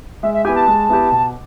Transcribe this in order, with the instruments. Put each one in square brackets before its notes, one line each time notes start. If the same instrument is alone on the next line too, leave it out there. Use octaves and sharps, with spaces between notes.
[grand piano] G#3 [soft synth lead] E5
[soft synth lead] E5
[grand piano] B3 E4 G4 [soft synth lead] G#5
[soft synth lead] A5
[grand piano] G#3
B3 E4 G4
B2